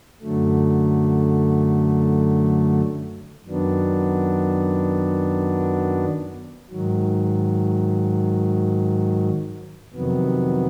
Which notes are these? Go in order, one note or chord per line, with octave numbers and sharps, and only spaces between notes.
F#2 D3 F#3 A3
F#2 D#3 F#3 B3 D4
G#2 D#3 F#3
F2 C3 D#3 F#3 B3